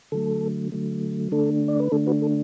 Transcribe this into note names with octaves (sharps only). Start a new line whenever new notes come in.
D3 F#3 A3 A4
D3 F#3 A3
D3 A3 D4 A4
D5
B4
D3 A3 D4 A4
F#4 B4
A4